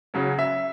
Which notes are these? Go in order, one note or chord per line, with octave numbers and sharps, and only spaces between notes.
C#3 F#3 C#4
E5